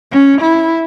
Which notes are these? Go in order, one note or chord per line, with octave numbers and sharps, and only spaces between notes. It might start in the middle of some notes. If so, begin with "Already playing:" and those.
C#4
E4